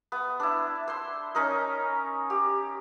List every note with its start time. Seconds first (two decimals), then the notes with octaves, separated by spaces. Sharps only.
0.12 B3
0.40 D4 E4
0.88 C5 C6
1.35 C#4 D#4 A#4 D#5
2.30 G4